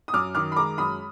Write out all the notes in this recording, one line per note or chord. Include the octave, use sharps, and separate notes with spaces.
D#6
F#2 D6 F6
D#3 D6 F6
B5
G#3 A#5 D6
F#2 B5 D#6